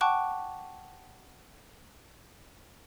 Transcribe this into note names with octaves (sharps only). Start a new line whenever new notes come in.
F#5 G5 A5 C#6 D6 F#6